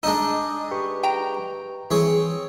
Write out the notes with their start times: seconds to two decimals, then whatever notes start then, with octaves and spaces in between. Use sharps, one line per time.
0.03 G#3 D4 D#4 D#5 A5 E6
0.71 G4 B4 C#6
1.03 G5 A#5
1.91 E3 C4 G#4 C#5